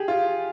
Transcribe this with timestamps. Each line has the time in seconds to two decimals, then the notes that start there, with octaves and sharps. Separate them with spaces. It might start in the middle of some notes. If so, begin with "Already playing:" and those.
Already playing: G4 G#4
0.08 F4